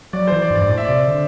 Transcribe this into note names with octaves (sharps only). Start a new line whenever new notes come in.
F#3 D5
E3 C5
D5
G2
D5
G2
A2 D5
E5
C3 D5
D3